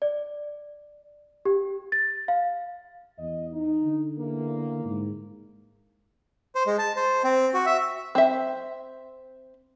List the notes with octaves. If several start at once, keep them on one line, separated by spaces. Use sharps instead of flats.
D5
G4
A6
F5
E2 D#5
D#4
D3
E2 A#3
G#2
C5
G#3
A5
C5
C4
F#4
E5
C4 E5